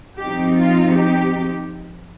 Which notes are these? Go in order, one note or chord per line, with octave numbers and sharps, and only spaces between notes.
F3 C4 D#4 G4
F4
G4